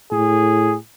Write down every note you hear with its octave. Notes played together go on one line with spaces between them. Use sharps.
A2 G#4